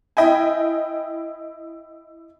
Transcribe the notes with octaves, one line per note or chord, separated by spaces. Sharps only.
E4 D#5 G5 G#5